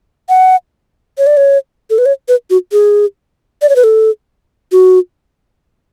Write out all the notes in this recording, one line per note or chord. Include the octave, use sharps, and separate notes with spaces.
F#5
C#5
D5
C#5
A4
B4
C#5
B4
F#4
G#4
D5
C#5
B4
A4
F#4